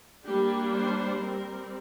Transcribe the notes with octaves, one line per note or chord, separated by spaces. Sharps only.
G3 A#3 D4 G4
C5
G3 C4 A#4